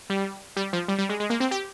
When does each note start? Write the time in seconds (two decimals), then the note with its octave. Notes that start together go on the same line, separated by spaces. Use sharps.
0.10 G3
0.56 G3
0.73 F3
0.88 G3
0.98 G3
1.09 G#3
1.20 G#3
1.30 A#3
1.40 C4
1.51 G4